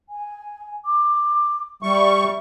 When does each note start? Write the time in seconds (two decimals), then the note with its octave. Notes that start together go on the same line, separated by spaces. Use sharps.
0.09 G#5
0.86 D6
1.83 G3 E5 C#6